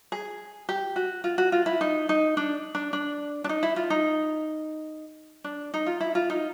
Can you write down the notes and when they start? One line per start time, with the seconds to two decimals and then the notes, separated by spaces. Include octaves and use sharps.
0.12 G#4
0.69 G4
0.96 F#4
1.24 F4
1.38 F#4
1.52 F4
1.66 E4
1.81 D#4
2.09 D#4
2.37 D4
2.75 D4
2.93 D4
3.44 D4
3.49 D#4
3.63 E4
3.76 F4
3.90 D#4
5.44 D4
5.74 D#4
5.86 F4
6.00 E4
6.15 F4
6.30 D#4